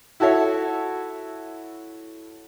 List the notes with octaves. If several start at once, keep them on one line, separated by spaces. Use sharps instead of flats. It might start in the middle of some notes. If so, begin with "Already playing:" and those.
E4 F#4 A4 C#5 E5